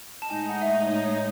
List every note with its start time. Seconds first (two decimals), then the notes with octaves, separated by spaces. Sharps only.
0.22 A5
0.30 A2 G#3 D#4 G#5
0.49 F#5
0.62 E5
0.68 D#5
0.87 C#5
1.05 C#5